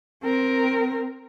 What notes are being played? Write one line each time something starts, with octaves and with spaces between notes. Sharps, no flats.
C4 A#4